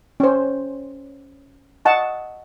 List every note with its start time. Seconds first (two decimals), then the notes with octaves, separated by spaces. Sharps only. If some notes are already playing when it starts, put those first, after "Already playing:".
0.20 C#4 C5
1.85 D#5 F#5 A5 C#6